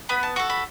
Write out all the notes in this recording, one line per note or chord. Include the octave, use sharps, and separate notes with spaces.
B3 B5
A5
F#4 A4 C#6
B5